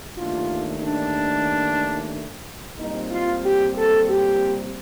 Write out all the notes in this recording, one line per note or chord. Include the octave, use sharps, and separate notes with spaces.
D#2 D#3 A3 D4 F4
D4
A#2 G3 C4 D#4
F4
G4
A4
G4